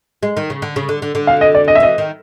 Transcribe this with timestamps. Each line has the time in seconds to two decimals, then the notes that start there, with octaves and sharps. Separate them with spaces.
0.23 G#3
0.37 D#3
0.50 C#3
0.62 D3
0.76 C#3
0.89 D3
1.02 D3
1.15 D3
1.27 F5
1.41 D#5
1.55 D5
1.68 D#5
1.75 E5
1.80 E3 D#5
1.98 D#3